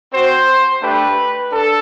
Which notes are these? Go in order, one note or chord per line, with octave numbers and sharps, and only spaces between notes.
C4 F#4 C5
A3 D4 G4 B4
D4 A4